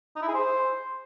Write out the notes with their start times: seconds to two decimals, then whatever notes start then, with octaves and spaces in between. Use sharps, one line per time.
0.16 D#4
0.22 E4
0.28 G#4
0.34 C5